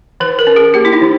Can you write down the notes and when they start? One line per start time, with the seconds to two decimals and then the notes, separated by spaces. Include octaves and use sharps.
0.20 E3 B4
0.39 A#4
0.47 C#4
0.56 G#4
0.74 A#3 G4
0.85 E4
0.93 D#4
1.01 E3